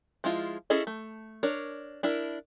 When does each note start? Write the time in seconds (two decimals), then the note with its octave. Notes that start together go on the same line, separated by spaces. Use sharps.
0.24 F3 G#3 E4 F4
0.70 C#4 E4 G#4 A4 D#5
0.87 A3
1.43 D4 A#4 C#5
2.03 D4 E4 A#4